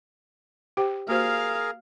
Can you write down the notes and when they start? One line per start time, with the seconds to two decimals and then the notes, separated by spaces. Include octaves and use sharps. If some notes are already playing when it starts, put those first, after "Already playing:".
0.77 G4 C5 G5
1.09 A#3 F#4 G#4 A#4 C5 F5